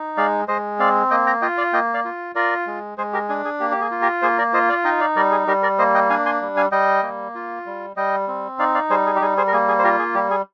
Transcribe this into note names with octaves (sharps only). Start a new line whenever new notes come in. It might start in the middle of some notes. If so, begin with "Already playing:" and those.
Already playing: D#4
G#3 D5 F5
G#3 C5 D#5
C4 D5 F5
A#3 D#5 G5
G5 A#5
F4 D#5 G5
D5 F5
A#3 D#5 G5
D5 F5
F4
F4 A#4 D5
G#3
G#3 G#4 C5
G4 A#4
D4 G#4
G#4
A#3 G4
G4
G#4
F4
G4 A#4
A#3 G#4 C5
A#4 D5
F4 C5 D#5
D5 F5
D#4 D#5 G5
D5 F5
G3 A#4 D5
G#4
G3 G4 A#4
A#4 D5
A#3 C5 D#5
D#5 G5
D4 F5 G#5
G#5 C6
G3
F5 G#5
G3 D#5 G5
A#3
F4
G3
G3 D#5 G5
C4
D#4 D5 F5
D5 F5
G3 G#4 C5
G#4
G4
G3 G#4
G#4 C5
A#4
A#3 G#4
G#4
C5
F4 G4 A#4
G#4
G3 G4
G#4